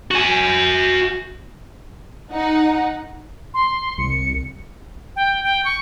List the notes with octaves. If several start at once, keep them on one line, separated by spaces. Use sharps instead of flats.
F#4 G#5
D#4 F#5
C6
C2 C#7
C2
G5
G5
C#6